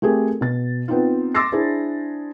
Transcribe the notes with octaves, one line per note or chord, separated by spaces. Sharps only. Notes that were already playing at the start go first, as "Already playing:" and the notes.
A3 C4 G4 G#4 A#4
B2 A6
B3 C4 D#4 F4
C6 D6 E6 A6 A#6 C7
D4 E4 G#4 C5